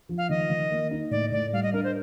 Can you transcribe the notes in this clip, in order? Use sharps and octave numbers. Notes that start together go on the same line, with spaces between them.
F3
F5
D#3 D#5
D#3
A#3
D#4
A2 D5
A2 D5
G3 F5
D#5
D4 A#4
C5